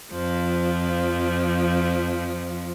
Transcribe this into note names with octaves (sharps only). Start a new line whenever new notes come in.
F2 F3